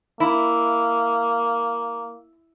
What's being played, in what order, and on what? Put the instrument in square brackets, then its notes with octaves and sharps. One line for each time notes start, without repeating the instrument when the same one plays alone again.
[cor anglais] A#3 [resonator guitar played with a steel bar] E4